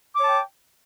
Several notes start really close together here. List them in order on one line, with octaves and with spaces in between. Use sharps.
D6 C#5 A5 G5